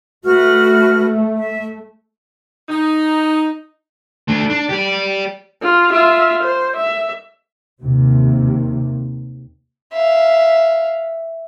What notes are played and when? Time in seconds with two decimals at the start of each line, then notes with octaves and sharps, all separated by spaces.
0.24 A3 F#4 B4 F6
1.37 E5
2.69 D#4
4.28 A3 D4
4.50 D4
4.69 G4 D5
5.62 F4
5.91 F4 E5
6.44 C5
6.77 E5
7.81 D#2 C3
9.93 E5 F5